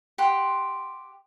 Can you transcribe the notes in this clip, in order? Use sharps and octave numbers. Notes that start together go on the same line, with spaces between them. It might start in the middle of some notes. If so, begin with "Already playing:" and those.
G4 F#5 C6